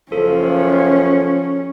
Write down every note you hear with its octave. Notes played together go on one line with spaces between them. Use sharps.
F#1 F3 C#4 A4